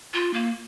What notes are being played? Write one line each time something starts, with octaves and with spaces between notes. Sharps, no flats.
F4
A#3